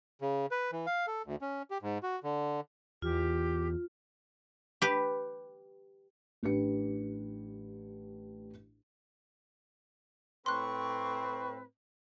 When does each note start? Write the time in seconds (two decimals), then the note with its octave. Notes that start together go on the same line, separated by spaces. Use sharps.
0.22 C#3
0.51 B4
0.72 E3
0.86 F5
1.07 A4
1.26 D2
1.42 C#4
1.71 G4
1.82 G#2
2.03 F#4
2.24 D3
3.02 E2 F4 G4
4.82 G4 B4
6.43 A1 D4 G4 B4 C#7
10.46 A2 C4 B4 C6 C#6 F#6